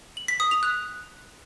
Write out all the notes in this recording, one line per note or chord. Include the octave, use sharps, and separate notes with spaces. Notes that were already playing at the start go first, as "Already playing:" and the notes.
F#7
B6
D#6
F7
F#6